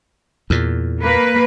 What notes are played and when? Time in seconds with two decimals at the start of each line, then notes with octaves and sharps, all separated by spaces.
0.50 E2 A#2
1.01 A#3 B4